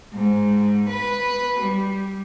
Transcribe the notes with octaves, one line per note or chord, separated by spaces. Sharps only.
G#2
B4
G3